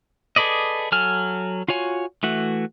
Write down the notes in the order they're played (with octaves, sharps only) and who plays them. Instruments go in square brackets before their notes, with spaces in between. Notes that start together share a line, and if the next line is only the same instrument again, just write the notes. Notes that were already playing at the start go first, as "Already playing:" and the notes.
[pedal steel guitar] G#4 A4 B4 D5 D#5
F#3 A4 G#5 F6
F4 F#4 C#5 G#5
E3 A3 F#4